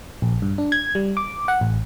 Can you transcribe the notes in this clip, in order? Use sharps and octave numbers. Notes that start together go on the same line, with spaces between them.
A#1
G2
D4
G#6
G3
D6
F#5
A1